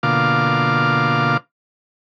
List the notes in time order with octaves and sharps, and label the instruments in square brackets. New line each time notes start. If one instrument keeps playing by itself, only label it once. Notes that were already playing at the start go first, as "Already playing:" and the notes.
[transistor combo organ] B2 D3 A#3 F4 F5 D6